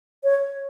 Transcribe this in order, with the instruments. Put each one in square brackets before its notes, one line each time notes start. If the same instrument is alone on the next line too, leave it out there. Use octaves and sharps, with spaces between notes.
[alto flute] C#5